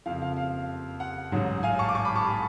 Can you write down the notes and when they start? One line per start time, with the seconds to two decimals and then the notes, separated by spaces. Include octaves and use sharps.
0.06 F#1 F2 F3 F5
0.22 F5
0.37 F5
1.00 F#5
1.32 A1 G#2 F#3
1.63 F5 G#5
1.79 A5 C#6
1.89 D6
1.95 A5 C#6
2.05 B5 D6
2.15 A5 C#6
2.26 G#5 B5